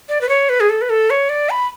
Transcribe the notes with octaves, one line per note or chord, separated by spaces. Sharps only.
D5
B4
C#5
B4
G#4
A4
B4
A4
C#5
D5
B5